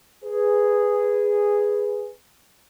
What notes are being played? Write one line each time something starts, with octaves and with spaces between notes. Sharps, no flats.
G#4 B4